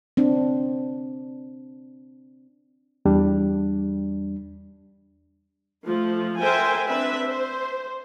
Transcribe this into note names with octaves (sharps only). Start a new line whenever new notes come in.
C4 D4
E2 G3 D4
F3 A3
A4 A#4 C5 E5 G5 G#5
C4 D4 B4 E5
C5